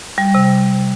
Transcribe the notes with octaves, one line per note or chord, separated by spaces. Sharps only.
G3
C3